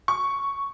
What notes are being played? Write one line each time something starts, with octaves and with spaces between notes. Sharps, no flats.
C#6